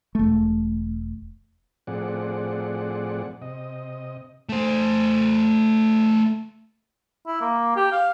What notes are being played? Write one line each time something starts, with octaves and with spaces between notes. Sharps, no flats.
E1 A3
A2 F3 C4 G#4 D5 F#5
C3 D#5
A3 C5
E4
A#3
G4
F5